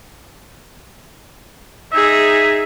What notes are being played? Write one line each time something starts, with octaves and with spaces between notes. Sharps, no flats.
D#4 G#4 E5